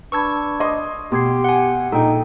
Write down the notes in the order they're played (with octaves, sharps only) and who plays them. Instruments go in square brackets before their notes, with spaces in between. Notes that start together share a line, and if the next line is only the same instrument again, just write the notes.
[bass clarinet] D4 [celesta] B4 A5 B5 [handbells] C#6 E6 G#6
[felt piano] D#5 C6 [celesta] D6 D#6
[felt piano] B2 [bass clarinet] G4 [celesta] C6 G#6 C7
[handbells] F#5 G#5
[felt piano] A#1 [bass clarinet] D#4 [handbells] A4 G5 [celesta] A#5